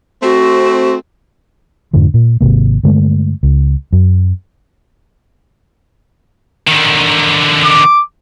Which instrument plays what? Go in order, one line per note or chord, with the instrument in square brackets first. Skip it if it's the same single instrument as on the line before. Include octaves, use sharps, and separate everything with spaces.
[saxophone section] A3 C4 [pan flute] F#4
[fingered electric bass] F2 G#2 D3 F3
A#2
G#1 F2 C3 A#3
G2 D3 G#3 A3
C#2
F#2
[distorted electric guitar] D3 D#3
[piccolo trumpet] D6